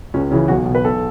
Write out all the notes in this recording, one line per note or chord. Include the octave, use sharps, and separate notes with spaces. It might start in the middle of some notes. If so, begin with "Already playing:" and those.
C#2 C#4
C#3 E3 C#4
B1 F#4
B2
B4
B1 A4